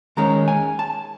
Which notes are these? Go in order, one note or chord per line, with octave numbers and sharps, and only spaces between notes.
D#2 D#3 G#3 C#4 A#5
G#5
A5